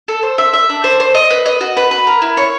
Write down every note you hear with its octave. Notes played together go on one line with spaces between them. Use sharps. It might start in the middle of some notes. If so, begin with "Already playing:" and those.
A4
C5
E5
E5
D4
C5
C5
D#5
B4
D#5
F#4
B4
B4
A#4
E4
C#5